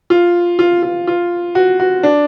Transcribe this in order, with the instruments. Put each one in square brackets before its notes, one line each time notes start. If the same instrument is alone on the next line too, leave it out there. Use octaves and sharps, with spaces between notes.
[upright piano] F4
F4
F4
F4
F#4
F#4
D4